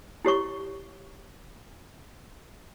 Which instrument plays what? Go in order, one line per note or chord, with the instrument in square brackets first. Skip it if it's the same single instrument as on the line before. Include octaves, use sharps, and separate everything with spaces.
[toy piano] E4 G4 C#5 C#6